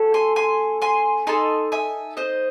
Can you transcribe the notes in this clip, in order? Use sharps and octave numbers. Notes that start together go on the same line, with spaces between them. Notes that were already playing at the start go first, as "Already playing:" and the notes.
Already playing: A3 C#4 F#4 A4
G#5 C6
G#5 C6
G#5 C6
D#4 A4 G#5 C6
E5 G#5
C5 D#5